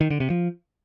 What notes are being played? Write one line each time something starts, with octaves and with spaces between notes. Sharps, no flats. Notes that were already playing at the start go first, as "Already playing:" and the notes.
D#3
D3
C3
F3